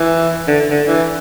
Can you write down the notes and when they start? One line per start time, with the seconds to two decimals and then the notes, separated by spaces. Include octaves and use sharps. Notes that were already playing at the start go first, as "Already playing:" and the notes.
Already playing: E3
0.48 D3
0.70 D3
0.88 E3